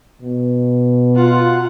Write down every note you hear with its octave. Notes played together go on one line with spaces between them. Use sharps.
B2
F4 F#5